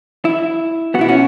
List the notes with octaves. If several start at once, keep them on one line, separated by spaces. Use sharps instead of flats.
E4
B2 B3 E4 F#4
C#4 F#4